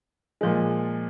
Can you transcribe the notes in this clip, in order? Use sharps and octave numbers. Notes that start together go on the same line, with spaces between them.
A#2 F3 G#3